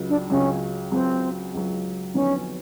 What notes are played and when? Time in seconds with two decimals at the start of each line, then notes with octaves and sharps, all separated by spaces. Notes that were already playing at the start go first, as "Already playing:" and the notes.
Already playing: C#2 C#3 F#3
0.09 D4
0.30 C#2 C#3 F#3 C#4
0.92 C#2 C#3 F#3 C4
1.54 C#2 C#3 F#3
2.14 F2 D3 F#3 B3 C#4 D#4